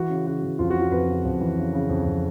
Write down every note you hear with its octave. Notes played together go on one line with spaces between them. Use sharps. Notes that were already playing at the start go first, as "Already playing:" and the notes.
Already playing: E3 F#4
C#3
C#3 F#4
E3
F2 F4
C#3 F#4
F4
F2 B4
C#3
F2
E3
C#3
C#3
F2
F2